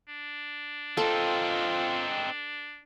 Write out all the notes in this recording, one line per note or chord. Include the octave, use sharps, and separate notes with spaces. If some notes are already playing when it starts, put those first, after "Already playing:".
D4
C4 D#4 F4 A4